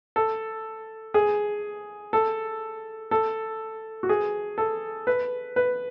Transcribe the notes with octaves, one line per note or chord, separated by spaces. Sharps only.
A4
G#4
A4
A4
F#4
G#4
A4
B4
B4